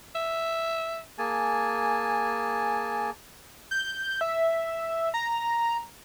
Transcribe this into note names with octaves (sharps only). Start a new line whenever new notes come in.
E5
A#3 G#4 G#5 A5
G6
E5
A#5